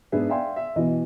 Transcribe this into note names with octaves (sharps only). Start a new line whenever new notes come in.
G#2 B3 D4 G#4 B4 E5
D5 E5 F5 G5 G#5 C6
E5
B2 E3 D#5